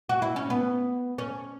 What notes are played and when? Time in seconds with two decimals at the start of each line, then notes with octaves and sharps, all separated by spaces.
0.09 F#4
0.22 E4
0.36 C#4
0.50 B3
1.18 C#4